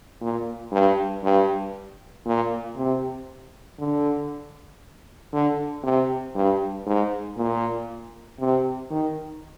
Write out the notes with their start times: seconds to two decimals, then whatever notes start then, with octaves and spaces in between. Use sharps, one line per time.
0.21 A#2
0.72 G2
1.24 G2
2.26 A#2
2.77 C3
3.79 D3
5.33 D3
5.84 C3
6.35 G2
6.86 G#2
7.37 A#2
8.39 C3
8.91 D#3